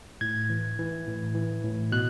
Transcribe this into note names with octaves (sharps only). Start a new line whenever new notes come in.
A2 G#6
E3
E3
A2
E3
A2
B2 F#6